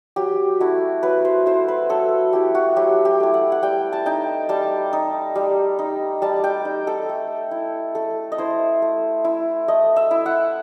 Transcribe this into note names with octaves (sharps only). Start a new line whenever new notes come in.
F#3 G4
A3 E4 F#4
F#3 B4
C5
A3 E4 C5
B4
F#3 A4
A3 E4 G4
F#4
F#3 G4
G4
A3 E4
F#5
F#5
G3 G5
A5
D#4 G5
G3 A5
D#4
G3
D#4
G3 A5
G5
D#4
A4
A3
E4
A3 A4
D#5
E4 C5
A3
E4
A3 D#5
E5
E4
F#5